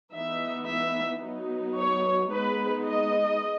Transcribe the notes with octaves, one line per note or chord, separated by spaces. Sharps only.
E3 B3 D#4 E5
E5
F#3 B3 D#4
C#5
G#3 B3 D#4 B4
D#5